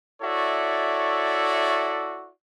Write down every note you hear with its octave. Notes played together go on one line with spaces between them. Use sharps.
E4 F#4 A4 C#5 D5 E5